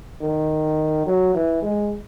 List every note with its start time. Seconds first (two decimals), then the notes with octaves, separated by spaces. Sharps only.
0.22 D#3
1.06 F#3
1.34 E3
1.62 G#3